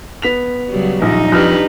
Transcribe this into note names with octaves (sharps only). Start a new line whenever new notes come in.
B3 B6 F7
C#3 F#3 G3
A#1 D#4
F2 D4 G4 B4 F6